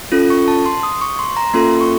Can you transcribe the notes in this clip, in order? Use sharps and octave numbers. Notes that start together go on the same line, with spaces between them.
C#4 F4 A4
C#6
A5
C6
D#6
C#6
C6
A#5
A#3 C#4 F4 A4 C6
C#6